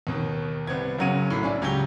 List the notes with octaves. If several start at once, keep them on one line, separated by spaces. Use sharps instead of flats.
D#2 B2 D#3
C2 B3 C4 G#6
F#1 C#3 F#3 F#5 D#7
B1 A2
C#4 D4 E4 D5 G#5
C#2 F#3 C#4 G4 G7